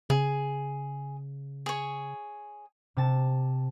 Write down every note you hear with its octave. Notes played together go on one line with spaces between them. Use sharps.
C#3 G#4
G#4 C#5
C3 A5